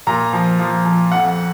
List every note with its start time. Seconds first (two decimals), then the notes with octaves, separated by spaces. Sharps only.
0.07 A#2 A#5
0.33 F3
0.59 F3
0.85 F3
1.12 F2 F#5